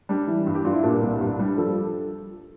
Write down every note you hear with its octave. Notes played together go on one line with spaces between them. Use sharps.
G3 D4
E3
G2
G4
G2 F4
E4
A#2 D4
C2
G2
G3
F3 A4